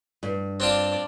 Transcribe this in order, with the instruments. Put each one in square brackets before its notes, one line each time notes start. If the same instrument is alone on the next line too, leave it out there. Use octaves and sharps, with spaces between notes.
[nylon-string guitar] G2
[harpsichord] C4 D4 F4 [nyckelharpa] D5 A5